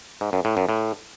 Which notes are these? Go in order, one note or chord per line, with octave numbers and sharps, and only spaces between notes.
G#2
F#2
A2
F#2
A2